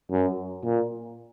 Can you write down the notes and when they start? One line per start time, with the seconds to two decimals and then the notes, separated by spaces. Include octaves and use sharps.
0.11 F#2
0.64 A#2